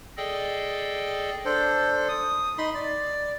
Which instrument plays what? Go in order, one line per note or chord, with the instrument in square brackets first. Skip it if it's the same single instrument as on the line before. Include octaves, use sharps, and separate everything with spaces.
[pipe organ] G#4 A4 D5 D#5 G5
[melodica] D4 A4 C5
D#6
D#4 B5 C6
D5